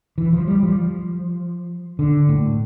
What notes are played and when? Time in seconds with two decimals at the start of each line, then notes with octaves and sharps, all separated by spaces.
0.18 E3
0.33 F3
0.47 G3
0.63 F3
1.99 D3
2.29 A2